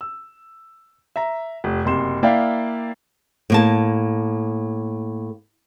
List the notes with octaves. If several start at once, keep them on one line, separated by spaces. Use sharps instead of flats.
E6
E5 A#5
F1
F#1 C3 C6 E7
A#3 E4 D5 E5 F5 G5
A2 A#3 A5